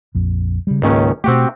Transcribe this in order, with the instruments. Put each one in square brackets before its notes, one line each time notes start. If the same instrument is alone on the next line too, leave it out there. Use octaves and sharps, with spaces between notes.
[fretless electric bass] A#1 F2
C#3 G3
[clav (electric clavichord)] C#2 D#3 C#4 [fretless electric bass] G#2 A#3
[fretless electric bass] B2 A3 [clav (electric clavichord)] C4 F#4 G4